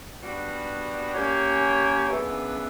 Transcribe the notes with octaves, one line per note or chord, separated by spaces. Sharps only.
G3 B3 D4 F#4
A#3 C#4 G4 C#5
F#2 C#3 E3 B3 D4